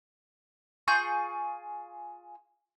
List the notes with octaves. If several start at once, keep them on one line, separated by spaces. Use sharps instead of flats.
F4 G#4 C#6 G6